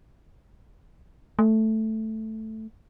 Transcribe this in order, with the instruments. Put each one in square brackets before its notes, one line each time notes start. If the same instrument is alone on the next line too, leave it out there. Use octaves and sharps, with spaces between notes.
[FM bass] A3